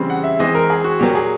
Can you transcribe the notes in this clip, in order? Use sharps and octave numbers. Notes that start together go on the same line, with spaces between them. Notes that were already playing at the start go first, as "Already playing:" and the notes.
Already playing: C#3 E3 G3 C4
F#5
E5
E3 G#3 C4 D#5
A#4
G#4
F#4
A#2 F#3 A#3 G4
G#4